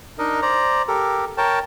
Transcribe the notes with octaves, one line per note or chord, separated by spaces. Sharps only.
D4 D#4 A#4 D#5
C5 D5 A#5
G4 A4 A#4
A#4 C#5 G5 A5